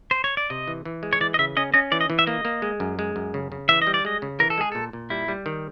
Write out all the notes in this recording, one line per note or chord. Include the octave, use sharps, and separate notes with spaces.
C5
C#5
D5
C3 D#5
E3
E3
G#3
C#5
E3 D5
D#5
C#3 E5
C#4 D#5
C#4 D#5
E3 D5
D#5
E3
E5
A#3 D#5
A#3
G#3
F#2
G#3
F#2
C#3
C#3
E3 E5
D#5
G3
D5
G#3 D#5
C#3
E3 A#4
A4
G#3 G#4
A#2 A4
A#2
G3 E4
G3
D#3